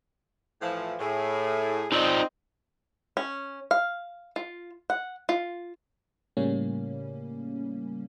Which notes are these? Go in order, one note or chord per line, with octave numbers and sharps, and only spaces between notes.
A2 E3 F3
A2 G#4
C4 D#4 F4 D5 D#5
C#4
F5
F4
F#5
F4
A2 C#3 G3 A#3 C#4